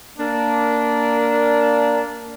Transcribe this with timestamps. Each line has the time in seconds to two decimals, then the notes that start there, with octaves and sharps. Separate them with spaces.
0.18 A#3 D4